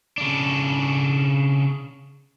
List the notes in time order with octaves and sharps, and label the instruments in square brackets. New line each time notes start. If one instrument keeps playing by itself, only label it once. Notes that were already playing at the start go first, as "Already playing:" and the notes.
[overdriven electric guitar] C#3 D4